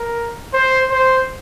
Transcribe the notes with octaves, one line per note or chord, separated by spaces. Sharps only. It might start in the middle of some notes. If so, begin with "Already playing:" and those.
Already playing: A#4
C5
C5